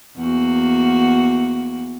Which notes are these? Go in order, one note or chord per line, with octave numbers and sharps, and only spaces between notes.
E2 A#3 F#4